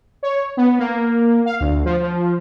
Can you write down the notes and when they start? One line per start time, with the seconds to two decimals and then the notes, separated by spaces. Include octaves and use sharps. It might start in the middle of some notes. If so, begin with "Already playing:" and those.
0.23 C#5
0.57 B3
0.79 A#3
1.46 F5
1.60 D2
1.85 F3
2.02 F3